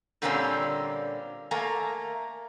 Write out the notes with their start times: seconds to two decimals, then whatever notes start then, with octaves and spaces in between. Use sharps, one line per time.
0.22 A#2 D3 G3 A#3 C4 C#4
1.51 A3 A#3 A#4 F5 G#5